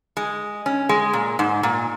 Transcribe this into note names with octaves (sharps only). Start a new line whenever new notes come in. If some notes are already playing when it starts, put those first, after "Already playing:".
G#3
C#4
G#3
A#2
G#2
A#2